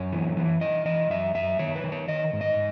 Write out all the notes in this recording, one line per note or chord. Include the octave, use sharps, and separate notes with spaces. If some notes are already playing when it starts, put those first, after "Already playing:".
Already playing: F#2 C#5
E3
E3
E3 D#5
E3 D#5
F#2 E5
F#2 E5
D#3 C#5
B4
D#3
C#5
D#3 D#5
G#2
D#5